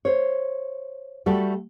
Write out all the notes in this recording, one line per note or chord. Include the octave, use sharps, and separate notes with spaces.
C5 C#5
G3 A3 F#4 G4 A4